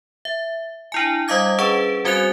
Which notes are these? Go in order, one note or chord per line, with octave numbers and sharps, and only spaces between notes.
E5
D4 E4 G#5
G3 D#5 F5 D6 G#6
C#4 G#4 B4 D7
G3 C4 F#4 G#5 F#6 F7